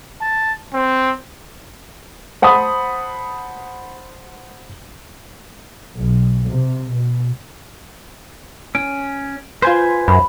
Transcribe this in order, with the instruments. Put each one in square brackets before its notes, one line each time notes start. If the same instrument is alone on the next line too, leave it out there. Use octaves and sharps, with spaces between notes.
[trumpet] A5
C4
[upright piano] C5 F#5 A5 B5 D#6
[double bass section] B1
C3
B2
[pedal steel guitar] C#4 [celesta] D7
[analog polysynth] F4 C5 [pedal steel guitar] B4 G#5
[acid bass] F#2 [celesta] B5